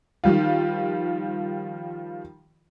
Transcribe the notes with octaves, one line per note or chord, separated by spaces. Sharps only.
D#3 F3 G3 F4